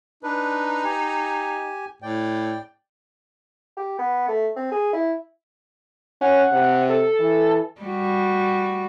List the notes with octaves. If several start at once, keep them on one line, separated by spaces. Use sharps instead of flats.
D4 D#4 B4
G4 G#5
A2 D5 G5
G4
B3
A3
C4
G#4
E4
C#4 F#5
C3
A4
E3
G3 F#4